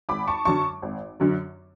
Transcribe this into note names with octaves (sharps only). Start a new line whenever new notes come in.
G#1 B5 D6
A5 C#6
F#2 D3 F#3 A5 C#6
G#1
F#2 D3 F#3